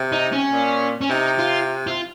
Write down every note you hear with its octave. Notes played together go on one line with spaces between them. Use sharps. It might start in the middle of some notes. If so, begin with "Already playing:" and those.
Already playing: C3
D#4
C#4
A#2
C#4
C3 D#4
F4
F4